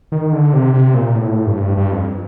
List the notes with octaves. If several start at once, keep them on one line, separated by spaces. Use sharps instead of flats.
D#3
D3
C3
C3
A#2
A2
G2
G2
F2